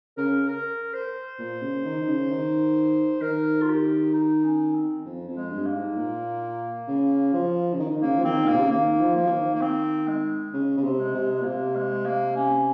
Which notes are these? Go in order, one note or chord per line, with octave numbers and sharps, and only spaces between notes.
C#3 A#4
A#4
C5
A#2
C#3
D#3
D#3
C#3
D#3
D#3 A#4
F4
G4
D#4
C#4
C4
F2
F2
G#3
G2
A#3
G#2
A#2
C#3
F3
C#3
D#3
D#3
C#3 A#3
F3
D#3 C4
A#2 A#3
C3
C#3
D#3 A#3
F3
A#3
F3
D#3
A#3
C4
G#3
C#3
C#3
C3
G#3
C3
G#3
A#2
C3 A#3
G#3
A#3
C#4